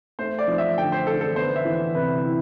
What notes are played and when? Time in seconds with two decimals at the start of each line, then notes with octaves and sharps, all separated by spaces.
0.19 A3 C5
0.39 D5
0.48 F3
0.58 E5
0.78 D3 G5
0.92 C5
1.07 D3 A4
1.21 A4
1.36 B3 C5
1.56 E5
1.65 E3
1.94 C3 B4
2.24 E4